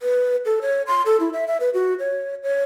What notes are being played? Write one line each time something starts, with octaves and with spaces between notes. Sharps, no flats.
B4
A4
C#5
C6
A4
E4
E5
E5
B4
F#4
C#5
C#5